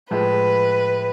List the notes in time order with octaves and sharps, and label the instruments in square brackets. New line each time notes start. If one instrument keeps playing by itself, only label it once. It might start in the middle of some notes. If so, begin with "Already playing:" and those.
[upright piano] A2 F3 G#3 [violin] B4